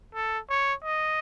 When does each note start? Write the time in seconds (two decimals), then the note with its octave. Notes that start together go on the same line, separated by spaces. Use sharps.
0.15 A4
0.50 C#5
0.84 D#5